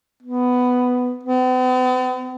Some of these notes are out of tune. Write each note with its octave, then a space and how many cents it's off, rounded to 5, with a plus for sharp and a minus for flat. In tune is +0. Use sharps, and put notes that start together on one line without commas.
B3 +10
B3 +45